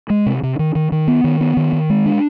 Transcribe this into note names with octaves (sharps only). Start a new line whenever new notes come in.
G#3
C3
C3
D#3
D#3
D#3
B3
D#3
B3
D#3
D#3
G#3
D4